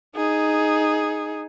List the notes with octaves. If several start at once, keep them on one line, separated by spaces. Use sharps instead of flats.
D#4 G#4